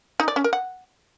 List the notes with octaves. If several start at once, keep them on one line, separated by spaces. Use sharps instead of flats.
D#4
D5
C#4
A#4
F#5